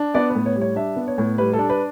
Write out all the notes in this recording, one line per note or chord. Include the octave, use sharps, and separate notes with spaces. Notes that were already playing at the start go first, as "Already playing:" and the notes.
Already playing: D4
B3 D5
B4
A2
C#5
G3
C#5
D4 E5
B3
C#5
A2
G3 B4
A4
D4
B4